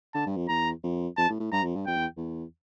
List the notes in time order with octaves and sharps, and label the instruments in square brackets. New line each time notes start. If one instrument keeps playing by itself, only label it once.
[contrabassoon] D3 [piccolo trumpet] A5
[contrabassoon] G2
F2
[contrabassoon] E2 [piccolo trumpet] A#5
[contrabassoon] F2
[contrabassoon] F2 [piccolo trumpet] A5
[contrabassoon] A2
A2
[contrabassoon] G2 [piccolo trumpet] A#5
[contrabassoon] F2
G2
[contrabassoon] F2 [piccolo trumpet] G5
[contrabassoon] E2
E2